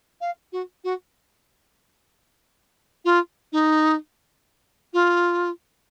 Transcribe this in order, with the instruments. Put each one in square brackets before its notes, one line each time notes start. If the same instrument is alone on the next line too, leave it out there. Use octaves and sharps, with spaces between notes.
[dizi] F5
F#4
F#4
F4
D#4
F4